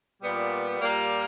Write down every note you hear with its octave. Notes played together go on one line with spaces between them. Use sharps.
A#2 G3 B3
A#2 G3 A#3